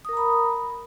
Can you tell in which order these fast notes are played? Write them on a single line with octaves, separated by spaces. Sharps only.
D#6 A#4 A#5 B5